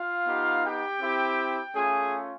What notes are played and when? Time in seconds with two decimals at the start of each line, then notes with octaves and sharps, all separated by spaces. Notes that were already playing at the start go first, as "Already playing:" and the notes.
Already playing: F4 F5
0.26 B3 D#4 G4
0.64 G4 G5
1.01 C4 E4 G4
1.75 A3 C#4 F4 G#4 G#5